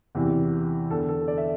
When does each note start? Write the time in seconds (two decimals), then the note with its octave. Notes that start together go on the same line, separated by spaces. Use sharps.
0.15 E2 C3 E3
0.90 E2 D3 A4
1.09 A4
1.28 D5
1.38 E5